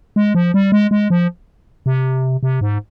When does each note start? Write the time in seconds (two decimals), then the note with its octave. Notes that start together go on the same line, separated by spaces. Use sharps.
0.16 G#3
0.35 F3
0.54 G3
0.72 G#3
0.91 G#3
1.10 F3
1.86 C3
2.43 C3
2.61 G#2